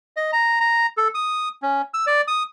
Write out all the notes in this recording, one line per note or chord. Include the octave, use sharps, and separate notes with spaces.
D#5
A#5
A#5
A4
D#6
C#4
E6
D5
D#6